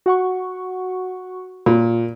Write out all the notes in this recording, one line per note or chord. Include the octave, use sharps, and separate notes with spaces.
F#4 F#5 C#6
A#2